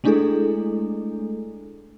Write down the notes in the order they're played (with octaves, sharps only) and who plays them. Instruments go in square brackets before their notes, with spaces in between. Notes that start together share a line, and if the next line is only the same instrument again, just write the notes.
[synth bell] G#3 A3 D4 E4 G#4 A4